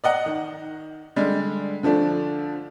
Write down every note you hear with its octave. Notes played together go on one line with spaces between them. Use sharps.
D5 D#5 F#5 A#5
D#3
D3 G3 G#3
D3 F3 A3 D4